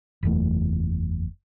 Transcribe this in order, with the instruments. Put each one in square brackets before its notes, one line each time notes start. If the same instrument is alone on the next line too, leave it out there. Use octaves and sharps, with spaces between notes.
[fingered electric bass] F#1 E2 A3